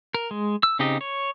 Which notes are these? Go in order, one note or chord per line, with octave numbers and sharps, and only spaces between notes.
A#4
G#3
E6
C#3 C4 D#4 G4 D#5
C#5